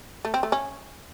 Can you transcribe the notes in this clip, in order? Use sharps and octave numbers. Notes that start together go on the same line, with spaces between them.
A3
C4
A3
C#4